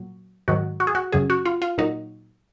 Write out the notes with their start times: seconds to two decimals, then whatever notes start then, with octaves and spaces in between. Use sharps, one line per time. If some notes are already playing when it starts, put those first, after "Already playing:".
Already playing: A#2 F#3
0.48 G#2 D#3 F#3 F#4
0.80 F#4
0.87 G#4
0.95 F#4
1.12 F#2 C#3 F#3 G#4
1.30 F#4
1.46 F4
1.62 F4
1.78 A#2 F#3 D#4